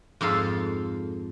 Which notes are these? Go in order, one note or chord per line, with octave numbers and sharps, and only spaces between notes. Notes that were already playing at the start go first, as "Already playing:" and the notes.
F2 G#2 A4 F5